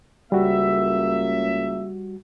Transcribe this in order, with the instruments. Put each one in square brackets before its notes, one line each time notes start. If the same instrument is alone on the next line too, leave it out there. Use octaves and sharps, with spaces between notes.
[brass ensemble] C#2 A#3 E5 [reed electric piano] G3 F#4